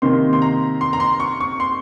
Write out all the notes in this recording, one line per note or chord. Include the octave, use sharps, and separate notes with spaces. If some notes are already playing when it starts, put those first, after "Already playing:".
C3 D#3 A#3 C6
C6
A#5
C6
A#5
C6
C#6
C#6
C6